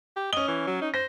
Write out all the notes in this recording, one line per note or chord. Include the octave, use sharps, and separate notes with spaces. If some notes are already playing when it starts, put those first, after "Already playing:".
G4
C#4 D#5 G7
E3
F#3
D#4
C5 A#6